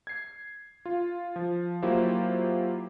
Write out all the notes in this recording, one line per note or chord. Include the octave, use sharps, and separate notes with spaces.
G#6 C7
F4
F3
F#3 A#3 E4 F4 G4 C5